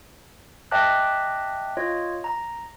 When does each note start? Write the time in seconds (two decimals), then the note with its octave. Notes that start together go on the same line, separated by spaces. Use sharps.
0.71 D#5 E5 G5 A5 D6 F#6
1.77 F4 C#5 D#5
2.24 A#5